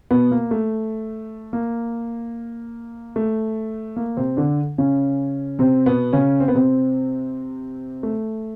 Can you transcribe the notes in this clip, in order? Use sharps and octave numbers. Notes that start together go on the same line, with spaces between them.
B2 B3
A#3
A3
A#3
A3
A#3
C3 C4
D3 D4
C#3 C#4
C3 C4
B2 B3
C#3 C#4
C4
B3
C3 C4
A3